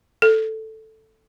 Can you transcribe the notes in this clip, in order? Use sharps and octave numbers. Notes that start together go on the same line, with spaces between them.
A4